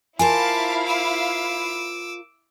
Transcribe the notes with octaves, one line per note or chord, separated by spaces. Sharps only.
E4 F4 A#4 C5 F5 G#5 A5 D6
D6 E6